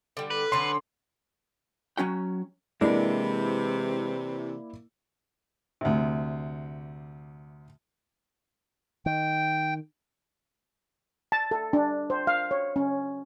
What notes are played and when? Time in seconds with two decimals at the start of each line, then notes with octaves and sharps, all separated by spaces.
0.17 D3 G3
0.31 B4
0.52 D3 F#3 C#4 C6
1.97 F#3 C#4 F#4 G5
2.81 C3 E3 G#3 A#3 D4 E4 D5
5.81 D2 C3
9.06 D#3 G5
11.32 A5
11.51 A4
11.73 D4
12.10 C5
12.27 F5
12.51 C#5
12.76 C#4